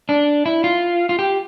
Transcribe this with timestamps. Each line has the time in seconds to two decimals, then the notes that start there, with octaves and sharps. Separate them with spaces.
0.09 D4
0.46 E4
0.64 F4
1.09 F4
1.19 G4